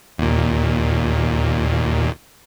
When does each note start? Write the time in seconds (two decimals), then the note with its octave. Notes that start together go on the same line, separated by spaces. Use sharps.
0.18 D#2 A#2